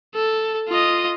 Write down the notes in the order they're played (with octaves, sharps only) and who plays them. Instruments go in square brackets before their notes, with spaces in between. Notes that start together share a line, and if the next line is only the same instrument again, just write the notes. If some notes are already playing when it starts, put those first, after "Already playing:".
[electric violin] A4
F4 D#5